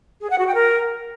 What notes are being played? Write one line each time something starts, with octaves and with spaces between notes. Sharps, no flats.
G#4
F#5
F#4
G5
A#4